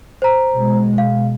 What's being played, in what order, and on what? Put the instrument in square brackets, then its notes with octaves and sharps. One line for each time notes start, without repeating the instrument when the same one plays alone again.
[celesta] C5 A#5
[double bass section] B2 G#3
[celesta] F5